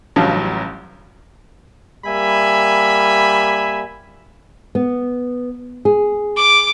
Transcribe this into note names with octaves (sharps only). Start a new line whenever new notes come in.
A1 G2 C#3 F3 F#3
G3 A#3 E5 G#5 B5
B3
G#4
D6